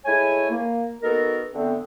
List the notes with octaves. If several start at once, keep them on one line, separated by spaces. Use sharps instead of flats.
G#3 A3 E4 C#5 G#5
A#3
B3 D#4 F#4 A4 A#4
D3 A3 B3 C4